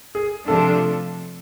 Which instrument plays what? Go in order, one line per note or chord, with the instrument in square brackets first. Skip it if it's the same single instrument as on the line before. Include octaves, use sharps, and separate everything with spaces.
[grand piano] G#4
[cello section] C3 F3 A3 D4 F4 [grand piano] A4